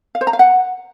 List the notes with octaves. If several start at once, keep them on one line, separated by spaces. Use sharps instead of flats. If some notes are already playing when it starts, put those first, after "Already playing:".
F5
C5
A#5
F5
F#5